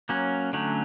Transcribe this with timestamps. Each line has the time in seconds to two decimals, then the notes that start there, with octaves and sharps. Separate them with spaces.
0.09 F#3 A#3 C#4
0.53 D3 F#3 A3 C#4